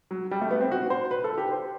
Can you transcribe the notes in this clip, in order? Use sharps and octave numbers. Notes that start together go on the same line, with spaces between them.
F#3
G3
A3
B3
C4
F#4
C5
B4
A4
G4
C5